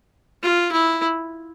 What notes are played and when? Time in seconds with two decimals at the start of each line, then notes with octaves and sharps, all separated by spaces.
0.43 F4
0.72 E4